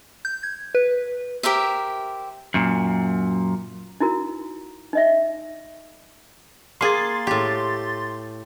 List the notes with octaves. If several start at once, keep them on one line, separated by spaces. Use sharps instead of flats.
G6
G#6
B4
G4 A#4 C5 E5
F#2 A#2
D#4 E4 F#4 A#4
D#4 D#5 E5
A#3 G#4 C6 A6
A2 G4